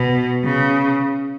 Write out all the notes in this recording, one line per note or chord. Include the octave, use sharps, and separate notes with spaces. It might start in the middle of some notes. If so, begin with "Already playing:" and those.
Already playing: B2
C#3